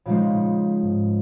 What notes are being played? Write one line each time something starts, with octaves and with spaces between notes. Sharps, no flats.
A#2 C#3 F3 G#3 D#4
G#2